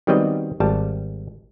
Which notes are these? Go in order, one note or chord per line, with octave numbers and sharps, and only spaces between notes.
D#3 F#3 G3 B3 C4 D#5
G#1 G3 A5